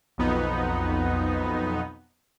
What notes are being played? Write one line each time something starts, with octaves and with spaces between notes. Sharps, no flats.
B1 F2 B3 D#4